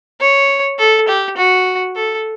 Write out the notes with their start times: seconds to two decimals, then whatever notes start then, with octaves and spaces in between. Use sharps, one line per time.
0.21 C#5
0.79 A4
1.08 G4
1.37 F#4
1.96 A4